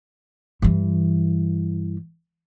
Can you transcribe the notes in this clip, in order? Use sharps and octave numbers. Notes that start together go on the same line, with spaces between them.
G2 E3